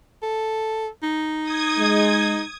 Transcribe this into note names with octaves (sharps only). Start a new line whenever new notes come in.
A4
D#4
D#6 G#6
G#3